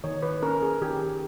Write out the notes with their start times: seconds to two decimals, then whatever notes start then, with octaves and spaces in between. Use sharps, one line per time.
0.04 D#3 C#5
0.22 B4
0.42 C#4 A#4
0.62 G#4
0.81 D#3 G4